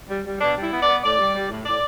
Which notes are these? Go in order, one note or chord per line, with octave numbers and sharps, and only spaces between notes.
G3
G3
B2 D4
G3
E4
B3
D5
B3
A2 D5
G3
G3
A2
A2 D5